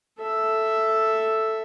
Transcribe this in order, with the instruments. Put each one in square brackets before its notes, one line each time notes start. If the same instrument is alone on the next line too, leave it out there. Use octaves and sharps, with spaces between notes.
[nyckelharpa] A4 E5